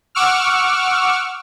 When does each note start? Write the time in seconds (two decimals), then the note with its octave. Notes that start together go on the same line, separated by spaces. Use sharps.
0.15 F#5 C#6 D6 E6 F6